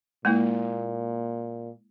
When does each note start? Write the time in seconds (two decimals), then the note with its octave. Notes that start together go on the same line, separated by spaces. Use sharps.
0.25 A#2 G#3 A#3 E4